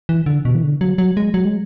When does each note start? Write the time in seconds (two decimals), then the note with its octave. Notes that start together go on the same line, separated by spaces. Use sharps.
0.09 E3
0.26 D3
0.45 B2
0.55 E3
0.63 D3
0.81 F#3
0.98 F#3
1.17 G#3
1.34 F#3
1.45 G#3